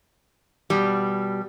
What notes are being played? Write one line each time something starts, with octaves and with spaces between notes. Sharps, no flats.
B2 G3